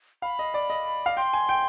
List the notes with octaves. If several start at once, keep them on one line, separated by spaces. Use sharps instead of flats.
F5 B5
D#5
D5
D#5
F5
G5 C6
G#5
G5